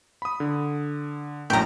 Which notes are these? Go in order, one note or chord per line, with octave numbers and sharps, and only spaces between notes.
B5 D#6
D3
A#1 F#2 A2 G5 A#5